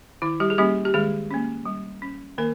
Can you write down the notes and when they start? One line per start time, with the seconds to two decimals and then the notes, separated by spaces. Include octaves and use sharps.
0.22 D#3 E4
0.40 G3 G4
0.50 G#4
0.58 G3 A#3 C#4 G4
0.85 G4
0.94 D#3 G#3 G#4
1.31 A#3 C#4
1.65 G3
2.02 C#4
2.38 D#3 A#3 A#4